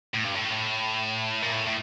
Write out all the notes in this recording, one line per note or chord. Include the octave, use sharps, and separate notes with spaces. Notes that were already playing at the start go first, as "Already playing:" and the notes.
A2
G2
A2
A#2
A2
A2